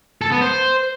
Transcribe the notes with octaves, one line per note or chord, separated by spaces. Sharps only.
A4
B3
C5